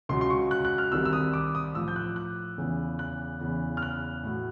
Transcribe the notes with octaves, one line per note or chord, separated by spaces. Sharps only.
C#2 C#3 F#3 C6
C6
C#6
F#6
F#6
F6
C2 C3 D#3 G3 E6
E6
D#6
D6
D#6
A2 F3 E6
G6
F#6
F#6
E2 C#3 E3
F#6
E2 C#3 E3
F6
F#6
A2 F#3